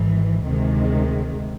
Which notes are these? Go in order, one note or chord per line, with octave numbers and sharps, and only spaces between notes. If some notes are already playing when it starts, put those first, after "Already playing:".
Already playing: G#1 G#2 E3
D2 C3 D#3 G#3